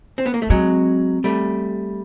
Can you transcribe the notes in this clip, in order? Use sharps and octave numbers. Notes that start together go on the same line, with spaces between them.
C4
B3
A#3
A3
F#3 G#3 C4
G3 A3